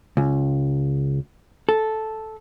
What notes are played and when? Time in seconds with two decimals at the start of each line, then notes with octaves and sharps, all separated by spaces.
0.17 C#2
1.69 A4